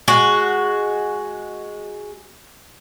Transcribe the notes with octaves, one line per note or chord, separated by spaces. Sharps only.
G#3 F#4